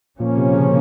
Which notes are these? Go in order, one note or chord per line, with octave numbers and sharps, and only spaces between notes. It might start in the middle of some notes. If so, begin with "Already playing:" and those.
A#2 F3 A#3 C#4
C3
C#3